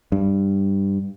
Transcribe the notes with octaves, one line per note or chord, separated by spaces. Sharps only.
G2